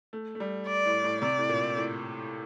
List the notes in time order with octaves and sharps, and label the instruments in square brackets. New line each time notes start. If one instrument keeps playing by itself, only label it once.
[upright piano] A3
A3
G3
[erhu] D5
[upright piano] A2
A2
[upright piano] C3 [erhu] D5
[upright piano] A2
A#2
A2